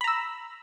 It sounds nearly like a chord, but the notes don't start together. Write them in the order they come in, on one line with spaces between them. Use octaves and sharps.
B5 A#5 E6